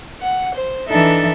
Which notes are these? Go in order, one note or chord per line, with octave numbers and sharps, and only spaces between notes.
F#5
C5
E3 D4 D#4 A4 E5